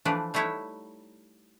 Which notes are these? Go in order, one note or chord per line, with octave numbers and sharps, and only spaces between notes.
E3 F3 A3 D4 B4 D5
G3 A3 D#4 E4 C#5 F#5